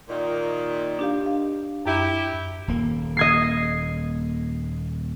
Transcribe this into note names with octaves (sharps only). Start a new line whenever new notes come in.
A#2 D#3
D4 G4 F5
F5
F#2 E4 G4
D#1 A#3
D#5 G#6 C7